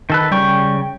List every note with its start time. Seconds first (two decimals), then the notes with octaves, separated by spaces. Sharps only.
0.10 D#3 A4 B4
0.32 C#3 G3 G5 C#6